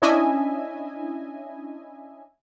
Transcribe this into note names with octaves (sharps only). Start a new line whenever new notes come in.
C#4 D4 E4 D#5 E5 G#5